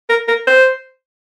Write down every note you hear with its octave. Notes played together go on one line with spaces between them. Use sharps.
A#4
A#4
C5